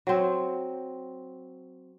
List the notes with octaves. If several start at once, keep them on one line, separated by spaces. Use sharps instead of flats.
F#3 C4